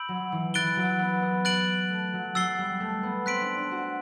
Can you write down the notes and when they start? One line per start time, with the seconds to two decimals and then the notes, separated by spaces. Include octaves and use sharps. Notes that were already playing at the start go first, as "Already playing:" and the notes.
Already playing: B5 E6 G6 D7 F#7
0.08 F#3
0.32 E3
0.54 E3 F#6 A6 D7 G7
0.77 F#3
0.99 B3
1.22 B3
1.45 F#6 A6 D7 F#7
1.90 A3
2.13 F#3
2.35 F#3 E6 A6 C7 G7
2.58 G3
2.80 A3
3.03 B3
3.26 C4 F#6 B6 D7 F#7
3.41 D4
3.56 D4
3.71 F#4